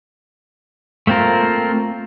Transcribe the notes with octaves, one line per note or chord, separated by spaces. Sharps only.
A3 A#3 C4 F4 A#4